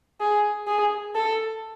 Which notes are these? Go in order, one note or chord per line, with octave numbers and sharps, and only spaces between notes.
G#4
G#4
A4